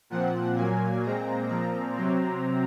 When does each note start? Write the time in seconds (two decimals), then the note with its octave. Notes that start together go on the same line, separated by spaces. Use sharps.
0.10 A#2 F3 C4 F#5
0.56 A#2 F#3 A#3 G#5
1.03 A#2 G#3 C4 A#5
1.50 A#2 F3 C4 A#5
1.96 C3 F#3 C4